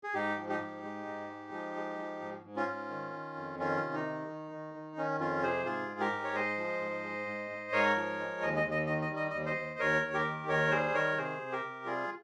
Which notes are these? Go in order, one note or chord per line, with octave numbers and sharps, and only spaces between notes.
G#4
G#2 D#4 G4
F3
D#4 G4
G#2
G#3
G#2
G#3
F3
G#3
F3
G#2
G#2
C#4 F4
G#2
D#3
D#3
F2
D#3 C#4 F4
C3
D#4
D#3
D#3
D#3
D#3
D#3 C#4
F2 C#4 F4
C3 G#4 C5
G#2 F4 G#4
G#3
G4 A#4
G#2
C#5
G#3 C5 D#5
F3
G#2
G#3
G#2
G#2
G#2 A#4 C#5
F3
G#3
D#2 D#5
D#5
D#2
D#5
D#3 D#5
D#5
G3
D#5
D#5
D#2
C5 D#5
D#2
D#2 A#4 C#5
D#2
G4 A#4
D#3
D#2 A#4 C#5
G3 G#4 C5
D#3 A#4 C#5
C3 G#4 C5
C3
G4 A#4
C3
G3 F4 G#4